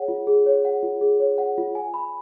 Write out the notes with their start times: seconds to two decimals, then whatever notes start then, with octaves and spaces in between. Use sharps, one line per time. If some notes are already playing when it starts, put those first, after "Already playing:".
Already playing: G#4 C#5 F#5
0.08 F4
0.27 G#4
0.46 C#5
0.65 F#5
0.83 F4
1.01 G#4
1.20 C#5
1.38 F#5
1.58 F4
1.75 G#5
1.94 B5